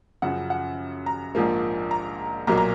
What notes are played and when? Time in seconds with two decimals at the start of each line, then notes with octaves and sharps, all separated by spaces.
0.22 F#2 C#3 F3 F#5
0.50 F#5
1.06 A#5
1.35 A#1 G#2 F3 A#3
1.91 A#5
2.47 B1 A#2 F#3 A#3 A#5
2.57 A#5